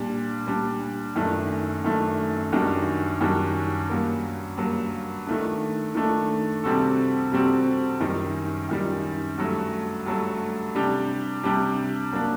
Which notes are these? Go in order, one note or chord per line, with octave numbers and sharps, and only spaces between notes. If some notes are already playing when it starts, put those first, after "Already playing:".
Already playing: A#2 G3 D4
A#2 G3 D4
F#2 D#3 A3 D4
F#2 D#3 A3 D4
F#2 D#3 G3 D4 F#4
F#2 D#3 G3 D4 F#4
G2 F#3 A#3
G2 F#3 A#3
D#3 A3 D4
D#3 A3 D4
C3 G3 C4 F#4 A4
C3 G3 C4 F#4 A4
F#2 D#3 G3
F#2 D#3 G3
G2 F#3 A3
G2 F#3 A3
C3 G3 D4 G4
C3 G3 D4 G4
F#3 A#3 D4